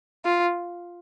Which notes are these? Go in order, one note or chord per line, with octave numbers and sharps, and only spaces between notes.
F4